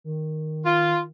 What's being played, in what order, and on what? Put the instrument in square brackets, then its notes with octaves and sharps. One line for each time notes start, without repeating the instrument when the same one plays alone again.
[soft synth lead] D#3
[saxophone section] F4